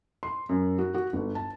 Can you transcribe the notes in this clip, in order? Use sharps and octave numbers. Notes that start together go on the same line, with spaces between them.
C6
F#2
F#4
F#4
G1
A5